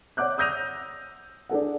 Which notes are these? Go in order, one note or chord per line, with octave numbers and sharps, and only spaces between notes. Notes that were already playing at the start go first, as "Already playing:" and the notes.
C#5 D5 F#5 D6 F#6 G6
D#6 E6 G6 A#6 D#7 F7
D4 G#4 A4 F#5